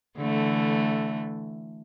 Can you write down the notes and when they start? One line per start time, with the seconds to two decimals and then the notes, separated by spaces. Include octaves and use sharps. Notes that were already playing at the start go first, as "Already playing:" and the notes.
0.18 D3 E3 A3